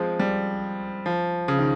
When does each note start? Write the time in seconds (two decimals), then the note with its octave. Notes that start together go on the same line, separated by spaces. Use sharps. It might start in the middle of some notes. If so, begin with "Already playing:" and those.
Already playing: F3 G#3 C4
0.19 G3
1.06 F3
1.48 C#3
1.59 D#3